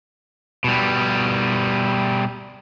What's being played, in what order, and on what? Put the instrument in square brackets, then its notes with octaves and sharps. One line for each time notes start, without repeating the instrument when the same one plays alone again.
[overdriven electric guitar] B2 G3